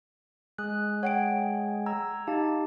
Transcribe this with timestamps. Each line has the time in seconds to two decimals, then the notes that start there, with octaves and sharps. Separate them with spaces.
0.58 G#3 D#6 F#6
1.03 C#5 F#5 G5 D7
1.86 A#5 E6 G#6
2.27 D#4 G4 F5 A5